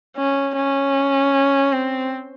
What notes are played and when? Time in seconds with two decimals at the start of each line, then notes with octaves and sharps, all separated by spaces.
0.16 C#4
0.56 C#4
1.73 C4